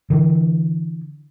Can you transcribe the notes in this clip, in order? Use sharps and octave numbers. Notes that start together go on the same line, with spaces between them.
D3 E3